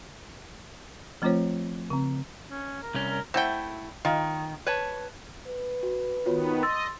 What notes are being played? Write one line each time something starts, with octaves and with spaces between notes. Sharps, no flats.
F3 A3 C4 F4 C5 C#5
C#3 C4
C#4
A#4
C2 C#4
A#4
A3 C4 E4 F#5 G5
D#3 F4
B4 C#5 A5
B4
F#4
D#3 B3 F4 F#4 C#5
D#5 C6 E6 A6